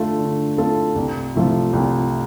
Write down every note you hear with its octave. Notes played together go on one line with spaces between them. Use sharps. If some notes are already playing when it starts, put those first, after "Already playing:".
Already playing: D3 A3 F4 A4
D3
A3 F4 A4
C2
C3 F3 A3 F4
C2